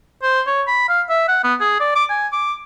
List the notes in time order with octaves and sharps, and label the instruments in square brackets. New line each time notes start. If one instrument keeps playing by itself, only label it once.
[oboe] C5
C#5
B5
F5
E5
F#5
B3
G#4
D5
D6
G#5
D6